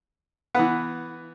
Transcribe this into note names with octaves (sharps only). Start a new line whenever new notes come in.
E3 B3 F#5